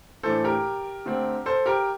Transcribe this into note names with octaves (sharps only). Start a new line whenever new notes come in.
A2 E3 A3 D4 A4 C5
G4 A#4
D3 A3 C4
A4 C5
G4 A#4